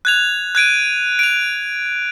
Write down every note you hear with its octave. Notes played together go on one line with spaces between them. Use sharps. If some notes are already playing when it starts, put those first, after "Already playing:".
F#6 G#6 F7
F#6 G#6 D7 D#7
D7 F7